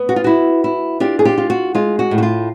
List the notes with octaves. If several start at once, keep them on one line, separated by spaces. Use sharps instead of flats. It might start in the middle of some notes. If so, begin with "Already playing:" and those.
Already playing: B3
F#4
F4
E4 F#4
E4
D4 F4 G4
G#4
F4 G4
F4
F#4
G#3 F4
F#4
A2
F#4
F4